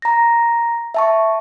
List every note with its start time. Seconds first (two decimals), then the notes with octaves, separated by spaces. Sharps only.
0.02 A#5 A#6
0.94 E5 A5 C#6